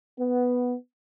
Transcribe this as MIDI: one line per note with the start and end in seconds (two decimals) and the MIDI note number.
0.19 0.75 59